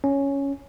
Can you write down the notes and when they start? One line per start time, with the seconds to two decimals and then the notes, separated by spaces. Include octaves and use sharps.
0.04 C#4